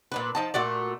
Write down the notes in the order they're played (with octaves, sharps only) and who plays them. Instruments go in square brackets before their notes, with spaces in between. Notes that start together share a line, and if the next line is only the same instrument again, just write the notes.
[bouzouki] A#2 D4 B4
F3 D#4 A5
A#2 A3 F#4 D5